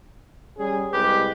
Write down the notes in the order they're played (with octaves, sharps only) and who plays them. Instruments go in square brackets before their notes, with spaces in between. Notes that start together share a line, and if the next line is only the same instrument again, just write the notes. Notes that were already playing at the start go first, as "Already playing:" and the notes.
[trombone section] G3 C#4 G#4
[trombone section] C2 G#3 B4 [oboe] G4